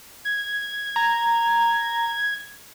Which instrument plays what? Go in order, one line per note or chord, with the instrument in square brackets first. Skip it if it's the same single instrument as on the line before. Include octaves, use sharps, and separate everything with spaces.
[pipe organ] G#6
[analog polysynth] A#5